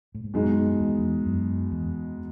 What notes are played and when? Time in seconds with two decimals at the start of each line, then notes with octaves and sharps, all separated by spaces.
0.15 A2
0.24 G#2
0.34 F#2 B2 G#3 D#4
0.79 E2
0.98 E2
1.26 F#2
1.72 E2